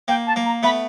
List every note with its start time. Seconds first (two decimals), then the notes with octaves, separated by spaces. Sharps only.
0.08 A#3 G5
0.27 A5
0.36 A#3
0.45 A#5
0.63 A3 B3 B5